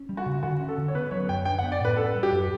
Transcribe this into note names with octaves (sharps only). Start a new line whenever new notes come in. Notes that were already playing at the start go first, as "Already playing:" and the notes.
Already playing: C#4
G3
F#4
C#3
D3 F#4
C#4
A4
D3
C#5
B3 B4
F#3 C#5
F#2 G5
D4 G5
F#5
B3
D5
A2 B4
C#4 A4
G3
G4
F#2